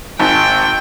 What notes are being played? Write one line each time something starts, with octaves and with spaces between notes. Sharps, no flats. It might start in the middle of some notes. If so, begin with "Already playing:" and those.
G#1 G5